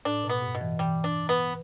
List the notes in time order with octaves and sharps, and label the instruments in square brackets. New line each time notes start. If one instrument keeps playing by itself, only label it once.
[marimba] A2 [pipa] D4
[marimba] B2
[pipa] B3
[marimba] G2
[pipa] B2
[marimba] E3
[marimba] E3 [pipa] G3
[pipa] D4
B3